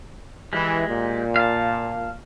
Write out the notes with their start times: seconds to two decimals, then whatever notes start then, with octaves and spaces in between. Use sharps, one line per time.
0.53 E3 G#3 G4
0.87 A#2
1.36 F5 A5